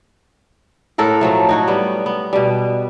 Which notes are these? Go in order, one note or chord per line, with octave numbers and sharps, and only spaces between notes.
A2 A4 A#4 F#5
F3 F#3 A3
D#4 F#4 C#5
G3 B3
B3
B2 G3